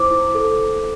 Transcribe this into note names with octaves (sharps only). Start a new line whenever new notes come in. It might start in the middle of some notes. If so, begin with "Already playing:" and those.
Already playing: E4 C5 D6
E4
A4